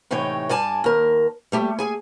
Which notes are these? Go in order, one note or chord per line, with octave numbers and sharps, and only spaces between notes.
A2 C3 E3 D#4 C#5 G5
G2 D5 G#5 A5
D#2 A#4
G3 A3 G4
G#4 G#5